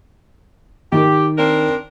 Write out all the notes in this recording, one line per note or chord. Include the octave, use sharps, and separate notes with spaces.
D#3 G4
C4 D4 A#4